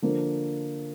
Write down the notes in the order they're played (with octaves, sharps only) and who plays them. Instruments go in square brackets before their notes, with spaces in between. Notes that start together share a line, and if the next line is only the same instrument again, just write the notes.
[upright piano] D3 F3 A#3